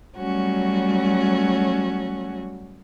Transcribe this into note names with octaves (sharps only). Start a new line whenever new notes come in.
F#3 G3 A3 C#4 F#4